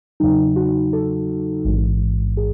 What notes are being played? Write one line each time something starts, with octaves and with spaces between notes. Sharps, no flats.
E2 C#3 F#3 D#4
F#4
A4
A1 G#2 E3 G#3
G#4